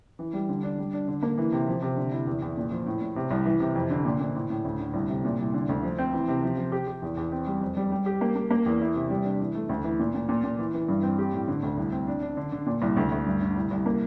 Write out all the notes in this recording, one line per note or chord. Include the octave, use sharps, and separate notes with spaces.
E3
G3
D3
D4
G3
D4
D3
A#3
E3
C3
F3
C3
D3
E4
E2
E2
A#2
F3
A2
A2
C3
C2
E3
C3
F2
D3
A#2
A#2
A2
A2
D2
D3
C2
C3
A#2
C2
D3
D2
F3
C4
E3
C3
F3
F3
G4
G4
E2
E2
C4
G3
F2
G3
G3
G4
A#3
A#3
A#3
E2
E4
C3
G3
D4
E3
A3
D2
E3
A#2
A#2
A#2
A#2
E3
E3
G2
C4
G4
A2
D3
D2
C2
C4
D4
D4
D3
D3
A#2
C2
D2
D2
G2
D3
C2
C2
A#3